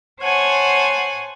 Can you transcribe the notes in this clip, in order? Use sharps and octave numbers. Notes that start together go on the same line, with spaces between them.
C5 C#5 F#5 G#5 A5